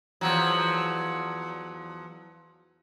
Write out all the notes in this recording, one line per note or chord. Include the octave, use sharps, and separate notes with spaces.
E2 F3 F#3